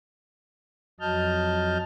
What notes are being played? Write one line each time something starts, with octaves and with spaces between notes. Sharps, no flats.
F2 F#3 D#5 A5 F6 G6